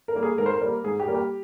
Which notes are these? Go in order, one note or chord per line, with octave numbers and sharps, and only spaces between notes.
A#4
G3 A#3
G#4
G#2 A#4
C5
A#4
G3 A#3
G#2 G#4
G4
G3 A#3
G4